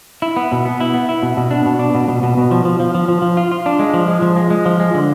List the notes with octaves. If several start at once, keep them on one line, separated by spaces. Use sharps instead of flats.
E4
B3
B2
B3
E4
B3
E4
B2
B2
D4
B2
D4
B2
B2
B2
B2
F3
F3
F3
F3
F3
F3
F4
F4
D4
G#3
F3
G#3
F3
G#3
G#3
F3
G#3
D3